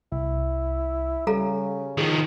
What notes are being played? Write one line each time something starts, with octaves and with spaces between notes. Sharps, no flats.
C2 E4
C#3 G3 A4 F5 A#5
D#3 F3 G#4